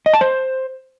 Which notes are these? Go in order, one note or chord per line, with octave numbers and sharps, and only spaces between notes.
D#5
A5
C5